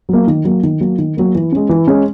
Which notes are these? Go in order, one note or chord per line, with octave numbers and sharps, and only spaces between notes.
F#3 A#3
D#3
F#3 A#3
D#3
F#3 A#3
D#3
F#3 A#3
E3
G#3 C#4
E3
G#3 C#4